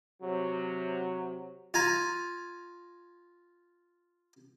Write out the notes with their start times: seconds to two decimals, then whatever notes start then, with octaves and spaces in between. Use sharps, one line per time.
0.21 C3 F#3
1.74 F4 G#5 A#5